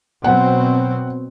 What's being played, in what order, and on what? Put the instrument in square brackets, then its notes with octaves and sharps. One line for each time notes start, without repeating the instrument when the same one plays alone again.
[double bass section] B2 F#3 C4 [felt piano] F#5